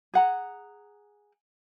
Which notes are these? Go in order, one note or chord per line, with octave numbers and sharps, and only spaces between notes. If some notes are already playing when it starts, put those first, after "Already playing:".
G#4 F#5 A#5